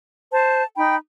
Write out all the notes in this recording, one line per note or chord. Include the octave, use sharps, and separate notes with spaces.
C5 A5
D#4 G5 B5